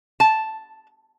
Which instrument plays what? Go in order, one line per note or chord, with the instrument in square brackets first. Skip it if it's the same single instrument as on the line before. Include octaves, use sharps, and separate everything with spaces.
[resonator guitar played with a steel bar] A5